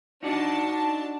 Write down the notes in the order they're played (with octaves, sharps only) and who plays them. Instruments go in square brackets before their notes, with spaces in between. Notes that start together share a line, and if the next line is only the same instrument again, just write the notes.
[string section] D4 A5 [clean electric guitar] D#4 F#4 D5